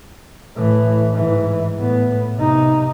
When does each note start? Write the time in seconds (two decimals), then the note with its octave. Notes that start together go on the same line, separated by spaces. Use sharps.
0.56 A2 E3
1.14 G#2 E3
1.79 A2 B3
2.36 C3 D#4